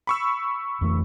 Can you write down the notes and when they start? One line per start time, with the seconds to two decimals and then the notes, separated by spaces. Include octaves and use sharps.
0.07 B5 C#6 E6
0.81 F2 E3 A3